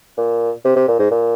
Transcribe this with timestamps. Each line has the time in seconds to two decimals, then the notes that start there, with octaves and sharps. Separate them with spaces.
0.18 A#2
0.65 C3
0.76 C3
0.88 A#2
0.99 G#2
1.11 A#2